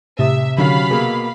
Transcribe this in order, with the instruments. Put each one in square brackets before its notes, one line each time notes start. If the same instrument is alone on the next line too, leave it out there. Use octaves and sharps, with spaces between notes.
[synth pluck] A2 A5 D#6 [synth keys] C3 [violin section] E5
[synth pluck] D3 D#3 [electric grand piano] F#3 C#4 [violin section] F5 B5
[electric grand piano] B2 A#3 [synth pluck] G#4 E6